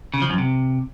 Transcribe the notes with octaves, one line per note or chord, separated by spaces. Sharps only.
C#3
F3
F#2
C3